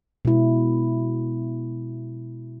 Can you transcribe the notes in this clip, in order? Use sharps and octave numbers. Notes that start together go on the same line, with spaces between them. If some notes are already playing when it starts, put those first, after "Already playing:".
B2 G#3 E4